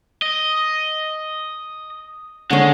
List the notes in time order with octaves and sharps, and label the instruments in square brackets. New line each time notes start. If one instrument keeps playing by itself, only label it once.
[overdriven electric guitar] D#5
[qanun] D3 C#4 [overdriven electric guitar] G#3